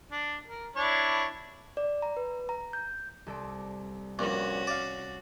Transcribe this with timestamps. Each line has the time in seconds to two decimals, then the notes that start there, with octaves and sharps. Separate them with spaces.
0.12 D4
0.48 A#4
0.76 D4 E4 C#5
1.77 D5
2.02 A#5
2.17 B4
2.49 A#5
2.73 G6
3.27 C2 A4 D5
4.19 A#1 G2 C#4 F#4
4.67 D5 F5